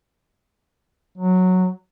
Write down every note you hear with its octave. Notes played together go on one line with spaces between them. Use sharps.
F#3